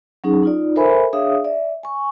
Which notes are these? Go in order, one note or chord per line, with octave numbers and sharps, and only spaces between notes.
F#3 C#4 D#4 G#4
D#4 F4 D5
A4 A#4 C5 E5 G#5 B5
D4 G#4 C#5 E5 F5 D#6
D5 E5
G#5 C#6